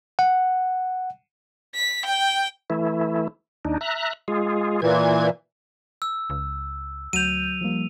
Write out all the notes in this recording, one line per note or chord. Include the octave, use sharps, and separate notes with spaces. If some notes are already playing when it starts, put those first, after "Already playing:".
F#5
B6
G5
E3 A3 E4
D#2 D4 D#4
E5 A#5 F#6
G#3 F4 G#4
A#2 E3 G#6
E6
C#2
D2 F#3 G6 D#7 F7
F3 G3 A#3